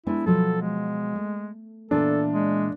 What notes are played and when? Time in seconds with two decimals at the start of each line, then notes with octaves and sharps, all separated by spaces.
0.06 G#3 B3 D4 E4
0.26 B2 F3 F#3 A4
0.62 G#3
1.16 A3
1.91 A#2 E3 B3 D4 A4
2.33 G#3